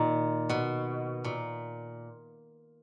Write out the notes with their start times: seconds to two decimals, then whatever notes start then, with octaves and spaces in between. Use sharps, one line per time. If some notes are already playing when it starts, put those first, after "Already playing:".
Already playing: A#2 D#3
0.49 B2
1.24 A#2